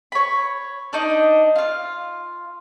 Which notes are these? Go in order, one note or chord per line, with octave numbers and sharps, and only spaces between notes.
C#5 B5
D4 D#4 D#5
F4 F5